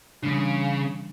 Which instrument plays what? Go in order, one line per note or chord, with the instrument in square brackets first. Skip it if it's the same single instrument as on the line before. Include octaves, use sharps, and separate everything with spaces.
[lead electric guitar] C#3 [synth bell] E3 G3 D4